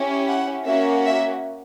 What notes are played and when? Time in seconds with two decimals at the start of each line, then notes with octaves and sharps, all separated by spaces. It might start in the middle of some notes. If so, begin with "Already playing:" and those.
Already playing: C#4 E4 G4
0.29 F#5
0.67 A#3 C#4 F#4 E5
1.05 E5